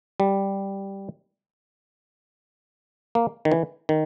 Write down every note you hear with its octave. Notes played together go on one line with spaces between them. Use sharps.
G3
A#3
D#3
E3
D#3